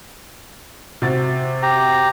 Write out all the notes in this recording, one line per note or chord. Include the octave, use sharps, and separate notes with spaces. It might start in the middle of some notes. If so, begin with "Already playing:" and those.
C3 F#4 A6
G4 A#5